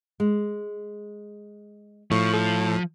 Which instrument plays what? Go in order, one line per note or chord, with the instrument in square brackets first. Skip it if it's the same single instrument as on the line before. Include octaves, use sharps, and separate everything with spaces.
[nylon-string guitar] G#3
[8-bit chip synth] A2 [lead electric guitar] F3 [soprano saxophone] C#6
[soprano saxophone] A4